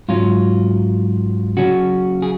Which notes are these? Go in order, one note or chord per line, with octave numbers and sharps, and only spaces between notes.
G#2 F#3 C#4 F4
C#3 F#3 C#4 F#4
G#4